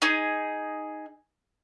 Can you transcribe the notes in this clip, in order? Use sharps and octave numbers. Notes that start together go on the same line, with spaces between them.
D#4 G#4